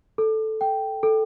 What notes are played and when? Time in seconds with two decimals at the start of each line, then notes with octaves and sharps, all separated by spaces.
0.18 A4
0.61 G5
1.03 A4